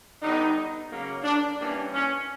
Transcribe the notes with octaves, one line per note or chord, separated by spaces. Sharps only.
D3 G3 B3 D#4
C#3 F#3 A#3
D4
E3 G3 A#3 C#4 D4
C#4